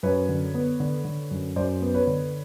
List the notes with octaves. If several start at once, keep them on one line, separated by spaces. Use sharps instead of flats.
F#2 B4 C#5
D3
B3
D3
D3
F#2
F#2 C5 D5
B3
B4 C#5
D3